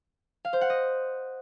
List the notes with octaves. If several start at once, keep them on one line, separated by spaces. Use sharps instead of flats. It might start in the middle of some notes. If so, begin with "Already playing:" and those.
F5
C5
F#5
D#5